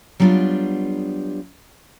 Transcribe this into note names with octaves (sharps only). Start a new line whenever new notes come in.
F#3 G3 B3 D4 F4 B4